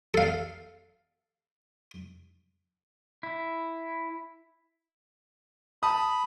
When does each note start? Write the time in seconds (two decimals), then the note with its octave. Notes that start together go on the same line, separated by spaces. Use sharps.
0.14 A4 F5
3.23 E4
5.83 A5 B5 D#6